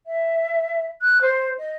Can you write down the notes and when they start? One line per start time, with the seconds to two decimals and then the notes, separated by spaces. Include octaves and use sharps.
0.06 E5
1.01 F#6
1.21 C5
1.58 D#5